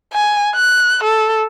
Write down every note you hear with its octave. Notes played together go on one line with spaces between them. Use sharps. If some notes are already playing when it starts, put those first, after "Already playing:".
G#5
F#6
A4